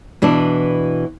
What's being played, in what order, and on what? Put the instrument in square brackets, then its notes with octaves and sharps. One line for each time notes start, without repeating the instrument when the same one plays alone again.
[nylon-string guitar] B2 E3 D4